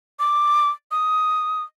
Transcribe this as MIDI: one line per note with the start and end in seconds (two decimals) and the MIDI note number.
0.19 0.70 86
0.91 1.63 87